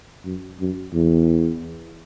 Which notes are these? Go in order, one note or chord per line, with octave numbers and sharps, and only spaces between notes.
F#2
F#2
E2